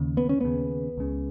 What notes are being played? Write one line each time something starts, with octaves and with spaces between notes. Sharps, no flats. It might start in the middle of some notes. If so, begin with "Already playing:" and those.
Already playing: D#2 C#3
B3
C#4
D#2 C#3 B3
C#2 C#3